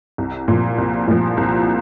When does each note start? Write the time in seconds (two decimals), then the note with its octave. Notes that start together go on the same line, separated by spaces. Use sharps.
0.18 C2
0.48 A#2 F3
0.78 C2
1.08 A#2 F3
1.37 C2